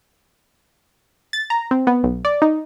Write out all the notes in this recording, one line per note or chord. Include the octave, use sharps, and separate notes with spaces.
A6
A#5
C4
B3
B1
D5
D#4